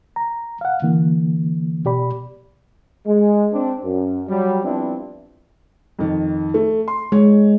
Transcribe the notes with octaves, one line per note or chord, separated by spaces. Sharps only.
A#5
F5 F#5
D3 E3 A#3
B2 G4 D5 B5
G#3
C4 D4
F#2
F#3 G3
F3 G3 B3 C4 D4 E4
F2 D#3
A3
C6
G#3 C#5